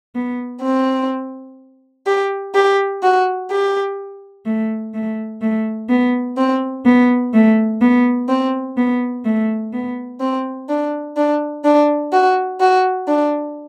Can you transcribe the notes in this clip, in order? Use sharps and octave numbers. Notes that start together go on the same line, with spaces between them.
B3
C4
G4
G4
F#4
G4
A3
A3
A3
B3
C4
B3
A3
B3
C4
B3
A3
B3
C4
D4
D4
D4
F#4
F#4
D4